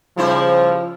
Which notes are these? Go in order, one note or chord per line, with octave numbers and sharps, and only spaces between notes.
C#3 F3 G3 E4 C5